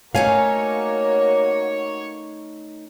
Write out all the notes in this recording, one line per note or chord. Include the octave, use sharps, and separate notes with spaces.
A3 A#3 C#4 D#4 F#4 C#5 F5 G#5